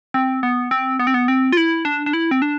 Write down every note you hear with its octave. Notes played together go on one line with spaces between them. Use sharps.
C4
B3
C4
B3
C4
B3
C4
F4
E4
D4
D4
E4
C4
D4